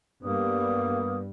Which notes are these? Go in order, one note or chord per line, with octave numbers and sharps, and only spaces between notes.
G2 G3 A#3 B3 D#6